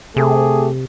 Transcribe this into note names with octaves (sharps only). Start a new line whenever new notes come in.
C3 A3 G4 G#4